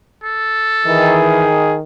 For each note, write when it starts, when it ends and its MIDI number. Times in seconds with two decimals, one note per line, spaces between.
0.24 1.32 69
0.86 1.84 51
0.86 1.45 52
0.86 1.77 68